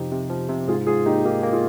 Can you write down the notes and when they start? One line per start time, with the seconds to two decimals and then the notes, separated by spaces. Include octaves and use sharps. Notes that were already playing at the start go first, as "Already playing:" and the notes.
Already playing: F2 C3 F3 D#4 G4
0.11 C3
0.30 F3
0.49 C3
0.68 G#2 F4 G#4
0.87 G#2 F4 G#4
1.06 A#3 D#4 G4
1.25 A#3 D#4 G4
1.43 A#3
1.53 F4 G#4